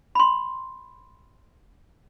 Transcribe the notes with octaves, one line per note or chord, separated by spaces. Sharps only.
B5 C6